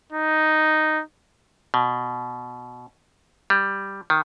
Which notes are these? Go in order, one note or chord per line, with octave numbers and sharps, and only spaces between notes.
D#4
B2
G3
D#3